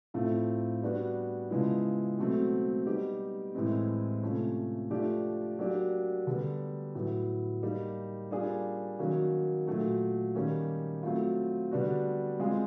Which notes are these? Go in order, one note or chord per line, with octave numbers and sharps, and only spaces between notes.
A2 F3 A3 C4 F4
G3 B3 D4 F#4
C#3 F3 G#3 B3 E4
B2 F#3 A3 C4
G3 B3 D#4 G4
A2 E3 G#3 C4
C3 F3 A3 C#4
F3 A3 D4 G4
F#3 A#3 D4 G4
D3 G3 B3
A2 F#3 B3
G3 A#3 D#4
G3 A#3 D4 F4 G#4
D#3 F#3 A#3 C#4 F#4
A#2 F#3 A3
D#3 G3 A#3 C#4
F#3 A3 C4 F4
D3 G3 B3 D4 F#4
G#3 C4 F4 G#4